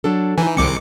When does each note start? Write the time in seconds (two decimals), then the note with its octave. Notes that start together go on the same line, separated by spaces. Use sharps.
0.04 F#3 D4 A4
0.38 E3 D#4 G#5
0.57 C2 D#3 G#3 C4 D6 C#7